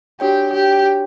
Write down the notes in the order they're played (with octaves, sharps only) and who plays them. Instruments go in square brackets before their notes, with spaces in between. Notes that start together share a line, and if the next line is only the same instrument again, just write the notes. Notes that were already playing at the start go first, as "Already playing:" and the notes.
[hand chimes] D4 F#4 C#5 G5 [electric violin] G4
[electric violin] G4